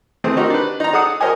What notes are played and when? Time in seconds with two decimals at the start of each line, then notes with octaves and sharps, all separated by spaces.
0.24 E3 A3 C4 G#4
0.37 C4 D#4 F#4 G4 A#4
0.50 D4 B4
0.80 D#4 A#5
0.93 G#4 A4 F#5 D#6
1.21 G4 A#4 C5 C#5 D#5 G#5